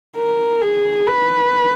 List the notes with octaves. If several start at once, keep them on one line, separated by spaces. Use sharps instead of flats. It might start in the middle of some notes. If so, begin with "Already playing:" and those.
A#4
G#4
B4